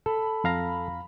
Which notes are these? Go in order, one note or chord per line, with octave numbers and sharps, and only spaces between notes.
A4 B5
F2 F5 A#5